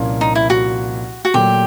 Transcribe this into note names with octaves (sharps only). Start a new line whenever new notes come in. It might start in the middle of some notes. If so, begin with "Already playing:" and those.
Already playing: C2 A#2 F3 A#3 C#4
D#4
E4
F#4
F#4
A#2 F#3 A3 G4